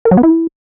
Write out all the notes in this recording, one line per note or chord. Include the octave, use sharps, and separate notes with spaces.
A#4
F#3
B3
E4